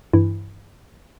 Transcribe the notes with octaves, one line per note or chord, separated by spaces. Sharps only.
G2 E3 E4